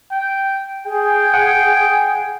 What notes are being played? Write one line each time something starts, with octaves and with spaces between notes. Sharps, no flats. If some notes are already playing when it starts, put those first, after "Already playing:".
G5
G#4 G5
F#5 G#5